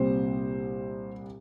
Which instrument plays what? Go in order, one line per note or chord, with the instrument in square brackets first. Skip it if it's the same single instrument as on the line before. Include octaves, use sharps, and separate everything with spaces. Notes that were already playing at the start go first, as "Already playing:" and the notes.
Already playing: [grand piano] C2 A#2 G3 C4 C5